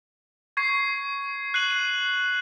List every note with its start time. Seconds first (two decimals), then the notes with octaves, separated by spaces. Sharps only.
0.57 C#6 G#6 C7
1.54 F#6 C7 D#7 F#7